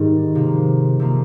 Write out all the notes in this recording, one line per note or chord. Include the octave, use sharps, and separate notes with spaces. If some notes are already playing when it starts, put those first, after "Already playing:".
Already playing: G#2 D#3 G3
C3 F3 A#3
C3 F3 A#3